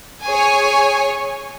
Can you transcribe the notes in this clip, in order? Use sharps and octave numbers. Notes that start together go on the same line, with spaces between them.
G#4 C#5 G#5